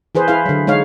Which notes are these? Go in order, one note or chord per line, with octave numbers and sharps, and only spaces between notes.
E3 G#4 B4 C5
E4 G#4 B4 F5
D3 F#3
G#3 D#4 C#5 F5